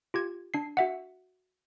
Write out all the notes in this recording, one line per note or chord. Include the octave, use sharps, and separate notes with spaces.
F4 G4 G#6
D4 C7
F#4 E5 F#5